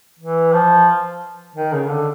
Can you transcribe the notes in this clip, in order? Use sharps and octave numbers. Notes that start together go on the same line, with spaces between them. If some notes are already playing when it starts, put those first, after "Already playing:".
E3
F3
D#3
C#3
D3